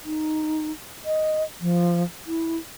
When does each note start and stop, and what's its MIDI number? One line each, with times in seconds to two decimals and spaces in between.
0.05 0.72 63
1.05 1.44 75
1.61 2.03 53
2.27 2.57 64